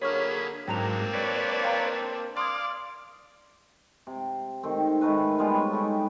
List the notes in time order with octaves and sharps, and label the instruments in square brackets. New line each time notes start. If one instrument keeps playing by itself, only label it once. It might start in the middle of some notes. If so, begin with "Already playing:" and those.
[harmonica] D3 F#3 A#3 [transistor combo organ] G#4 B5 [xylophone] C#5 C#6 F6
[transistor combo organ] G#2 F#3 [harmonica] A#3 C4 D4 [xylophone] G5 A#5 F7
[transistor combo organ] B4 C#5 D5
[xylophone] F5 G5 A#5
[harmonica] D5 [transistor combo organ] F5 D6 [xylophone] C6 D#6 G#6
[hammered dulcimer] C3
D#3 A3 C4
G#2 D#3 A3 B4
G3 G#3 B3 F4
D#4 C#5
A3 D#4 E4 G4